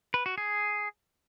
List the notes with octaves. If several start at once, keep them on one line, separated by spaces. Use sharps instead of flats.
B4
F#4
G#4